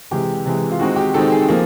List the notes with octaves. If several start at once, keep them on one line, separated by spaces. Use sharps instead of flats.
C3 E3 G#3 G4
C3 E3 G#3
F4
D#3 G#3 C4 D#4 F#4
G4
D#3 G#3 C4 D#4 A4
G#4
F3 A#3